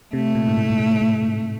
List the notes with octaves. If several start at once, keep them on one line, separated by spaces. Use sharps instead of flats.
C3 A3
A#2
G#2
A2
G#2
A2
A2
G#2